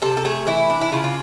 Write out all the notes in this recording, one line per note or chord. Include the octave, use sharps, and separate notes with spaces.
C3 A4
A4
A3 G#4
E3 E4
D4
E4
C#3 F4
F4